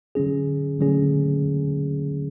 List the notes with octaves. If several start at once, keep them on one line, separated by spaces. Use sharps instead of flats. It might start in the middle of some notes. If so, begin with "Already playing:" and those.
D3 F#3 C#4 G#4
D3 F#3 C#4 G#4